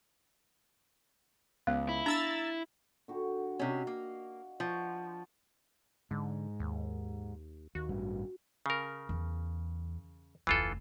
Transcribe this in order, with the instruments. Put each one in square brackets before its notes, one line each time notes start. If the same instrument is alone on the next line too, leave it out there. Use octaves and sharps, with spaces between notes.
[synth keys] C#2 [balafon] B3 [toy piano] F5
[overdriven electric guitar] E4
[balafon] D4 [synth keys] A#5 E6 A6
[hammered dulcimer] D3 F#4 G4
[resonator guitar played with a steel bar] C3 C#4 [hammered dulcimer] F#4 D#5 F5
[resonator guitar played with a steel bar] A#3
[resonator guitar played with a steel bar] F3 [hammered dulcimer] F#5 C#6
[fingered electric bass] G#2 [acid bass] D3
[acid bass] D#2
[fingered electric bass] D#2 [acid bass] F#4
[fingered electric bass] A1 G2
[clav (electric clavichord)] C#3 A#4
[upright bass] E2
[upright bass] F1 D2 [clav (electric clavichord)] E3 F4 A4